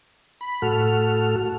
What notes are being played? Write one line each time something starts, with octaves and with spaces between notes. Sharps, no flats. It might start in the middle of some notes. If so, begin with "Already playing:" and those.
B5
A2 F#4 A4 F6